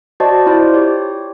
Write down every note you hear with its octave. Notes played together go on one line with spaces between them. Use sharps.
F#4 C5 D5 D#5 A5
E4 F4 C5 D5
G4 C#5